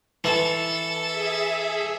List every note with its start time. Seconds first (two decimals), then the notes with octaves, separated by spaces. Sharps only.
0.24 E3 A4
1.08 G#4 E5